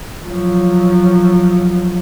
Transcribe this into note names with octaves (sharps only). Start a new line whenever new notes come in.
F3 F#3